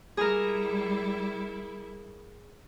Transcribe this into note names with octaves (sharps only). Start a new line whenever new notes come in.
G3 E4 G#4 A#4